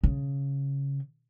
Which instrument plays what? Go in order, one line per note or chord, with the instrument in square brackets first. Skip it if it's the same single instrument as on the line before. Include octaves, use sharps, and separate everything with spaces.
[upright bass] C#3